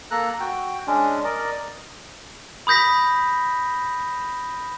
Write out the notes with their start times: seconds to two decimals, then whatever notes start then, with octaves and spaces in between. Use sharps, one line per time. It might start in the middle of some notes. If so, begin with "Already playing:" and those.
0.11 A#3 A4 A#5 F#6
0.40 F#4 G5
0.87 G#3 C#4 D4
1.24 A#4 D5 D#5
2.67 B5 D#6 G6 A#6 B6